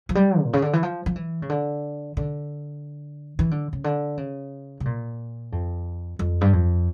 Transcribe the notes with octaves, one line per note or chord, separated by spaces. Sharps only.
F3
G3
A#2
C#3
D3
E3
F3
F3
E3
C#3
D3
D3
E3
D3
C#3
D3
C#3
C#3
A#2
F2
F2
G2
F2